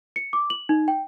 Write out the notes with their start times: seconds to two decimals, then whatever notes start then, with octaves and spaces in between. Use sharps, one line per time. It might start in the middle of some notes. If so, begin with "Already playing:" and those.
0.16 C#7
0.33 D6
0.50 F#7
0.69 D#4
0.88 G5